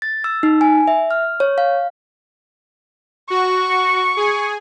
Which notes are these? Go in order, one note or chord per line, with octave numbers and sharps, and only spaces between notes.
A6
E6
D#4
G#5
E5
F6
C#5
F5
F#4 C#6
G#4 G#5